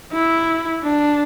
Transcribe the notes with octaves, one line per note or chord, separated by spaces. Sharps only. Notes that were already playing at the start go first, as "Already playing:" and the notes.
E4
D4